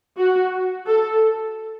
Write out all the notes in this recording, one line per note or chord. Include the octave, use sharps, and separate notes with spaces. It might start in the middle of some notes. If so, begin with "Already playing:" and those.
F#4
A4